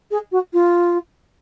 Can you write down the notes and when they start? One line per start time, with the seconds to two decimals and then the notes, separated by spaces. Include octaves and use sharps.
0.10 G#4
0.31 F#4
0.53 F4